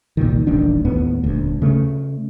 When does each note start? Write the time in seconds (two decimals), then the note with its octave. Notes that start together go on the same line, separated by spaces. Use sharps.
0.17 C2 A#2 D#3
0.47 D#1 A1 D#3 D4
0.85 D#2 A2 B3
1.24 D#1 D2
1.62 C#3 A3